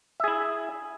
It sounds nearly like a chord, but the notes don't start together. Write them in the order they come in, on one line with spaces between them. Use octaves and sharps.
E5 G#4 E4